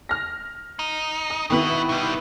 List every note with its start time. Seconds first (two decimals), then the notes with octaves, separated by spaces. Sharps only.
0.09 F6 A#6
0.79 D#4
1.30 D#6
1.50 B2 D#3 B3 E4 F#4
1.89 B2 G3